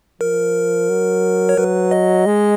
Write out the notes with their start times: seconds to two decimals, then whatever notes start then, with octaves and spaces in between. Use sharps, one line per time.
0.21 F3 A#4
0.90 F#3
1.49 C#5
1.58 F#3 B4
1.91 D#5
2.26 G#3